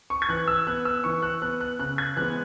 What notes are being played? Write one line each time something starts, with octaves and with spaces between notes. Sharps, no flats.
C#6
G#6
E3 F#6
E6
B3 F#6
E6
E3 C#6
F#6
B3 F#6
F#6
C#3 F#6
G#6
E3 G#3 B3 F#6